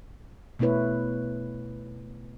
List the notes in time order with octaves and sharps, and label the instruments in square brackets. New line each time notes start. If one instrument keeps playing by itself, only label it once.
[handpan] B2 A3 B3 E4 B4 C#5